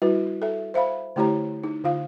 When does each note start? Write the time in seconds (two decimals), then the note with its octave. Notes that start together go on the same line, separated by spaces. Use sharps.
0.02 G3 E4 F#4 B4
0.42 A4 E5
0.74 C5 E5 F5 B5
1.16 D3 A3 E4 G4 C#5 A#5
1.64 D#4
1.84 D3 F4 F5